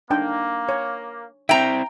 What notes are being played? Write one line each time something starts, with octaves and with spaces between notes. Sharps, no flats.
A#3 D4 D#4 G5
C#5
C4 E4 E5 G5 A#5